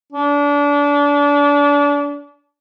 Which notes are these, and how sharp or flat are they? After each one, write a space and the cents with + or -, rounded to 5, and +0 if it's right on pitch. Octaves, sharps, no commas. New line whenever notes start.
D4 -30